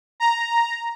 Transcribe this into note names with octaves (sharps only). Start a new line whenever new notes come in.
A#5